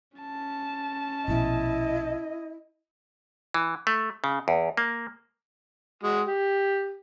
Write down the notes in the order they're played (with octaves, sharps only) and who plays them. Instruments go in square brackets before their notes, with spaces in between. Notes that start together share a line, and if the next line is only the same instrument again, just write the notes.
[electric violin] C#4 A5
[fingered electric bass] A#1 B2 [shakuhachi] E4 [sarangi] D#5
[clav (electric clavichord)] E3
A3
C#3
E2
A#3
[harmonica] G#3 F#4
G4